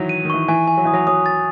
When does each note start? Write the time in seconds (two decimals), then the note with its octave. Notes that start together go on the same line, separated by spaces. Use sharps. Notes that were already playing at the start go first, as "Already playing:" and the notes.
Already playing: D#3 E3 F#3
0.09 D#7
0.25 D#3
0.30 E3 C#6
0.48 E3 G#5
0.68 G#5
0.78 F#3
0.85 E3 D#6
0.93 F#3
1.07 F#3 D#6
1.26 A6